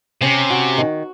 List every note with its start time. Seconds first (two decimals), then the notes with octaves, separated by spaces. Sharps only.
0.21 C3 C#4
0.50 F#4
0.78 D#3